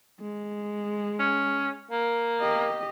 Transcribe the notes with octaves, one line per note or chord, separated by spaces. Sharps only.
G#3
C#4
A#3
G4 D#5